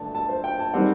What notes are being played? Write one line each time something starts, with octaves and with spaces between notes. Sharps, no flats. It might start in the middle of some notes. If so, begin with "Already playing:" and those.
Already playing: G2 D3 A3 A5
A5
C5
G5
A5
D#3 G3 C4 F#5